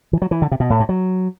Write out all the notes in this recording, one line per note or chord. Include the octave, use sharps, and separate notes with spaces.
E3
F#3
E3
D3
C3
B2
A2
G2
F#3